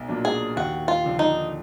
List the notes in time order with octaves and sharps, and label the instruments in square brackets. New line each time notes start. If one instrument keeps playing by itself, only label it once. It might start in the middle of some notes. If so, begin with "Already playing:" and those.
Already playing: [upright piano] B1
A#2 F#3 D4
[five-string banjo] G#4
[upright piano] D#2 [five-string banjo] F#4
[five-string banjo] F4
[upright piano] D3 F3
[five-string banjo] D#4